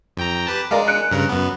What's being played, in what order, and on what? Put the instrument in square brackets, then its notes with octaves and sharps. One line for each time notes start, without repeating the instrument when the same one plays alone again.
[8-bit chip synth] F2 G5 A#5
G4 B4 A5
[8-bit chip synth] G#3 [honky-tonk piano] A#4 D5 F5
[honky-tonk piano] F#6 C#7 D7
[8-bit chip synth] G2 C#3 A#4
F#2 B3